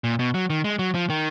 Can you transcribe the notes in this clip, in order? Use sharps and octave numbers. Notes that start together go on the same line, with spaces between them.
A#2
B2
F#3
D#3
G#3
F#3
F3
D#3